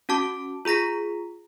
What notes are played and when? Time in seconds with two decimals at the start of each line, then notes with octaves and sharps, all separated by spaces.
0.09 C#4 F#4 A5 D6
0.65 F4 G#4 A#5 A#6 B6